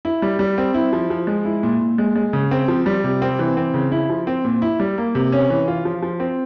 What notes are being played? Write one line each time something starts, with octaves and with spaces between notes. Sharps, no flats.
E4
G3
G3
C4
E4
F3
F3
G#3
E4
A#2
A#2
G#3
G#3
C#3
C4
F3
G3
C3
C4
E3
C4
C#3
E4
F3
C4
A#2
E4
G3
A#3
C3
C#4
E3
F4
F3
F3
C4